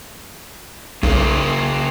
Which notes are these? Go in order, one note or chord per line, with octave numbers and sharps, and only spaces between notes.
B1 C#3 A#3